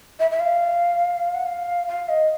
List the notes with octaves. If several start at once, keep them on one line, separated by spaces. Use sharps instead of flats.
E5
E5
F5
F#5
F5
F5
D#5